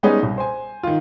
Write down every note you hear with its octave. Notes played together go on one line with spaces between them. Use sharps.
G3 G#3 B3 C#4 D#4 G#4
C2
C5 G#5
D#3 F4